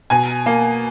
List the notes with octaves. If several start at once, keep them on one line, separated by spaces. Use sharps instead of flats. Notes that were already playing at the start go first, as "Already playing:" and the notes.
B2 G#5
A#3